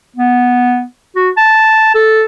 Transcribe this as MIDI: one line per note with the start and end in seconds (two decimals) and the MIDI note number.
0.16 0.83 59
1.16 1.29 66
1.37 1.94 81
1.95 2.24 69